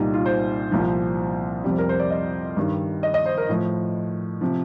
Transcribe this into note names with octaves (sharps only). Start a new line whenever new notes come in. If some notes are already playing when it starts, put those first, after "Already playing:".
Already playing: C2 A#2 G3 D#4
F4
C5
C2 A#2 F3
F2 C3 G3
A#4
C5
D5
D#5
G2 D#3 G3
D#5
D#5
C5
A#4
A2 F3
C3 F3